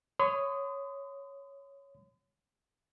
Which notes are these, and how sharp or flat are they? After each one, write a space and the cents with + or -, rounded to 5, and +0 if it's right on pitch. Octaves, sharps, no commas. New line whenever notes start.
C#5 +0 C6 -45 D#6 +0